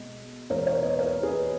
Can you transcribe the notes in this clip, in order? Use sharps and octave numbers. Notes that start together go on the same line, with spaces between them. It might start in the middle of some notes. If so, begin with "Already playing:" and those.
Already playing: B2 G#3 D#5
E2 B2 G#3 A#4 C#5
A#4 C#5
B4 D#5
A#4 C#5
G#4 B4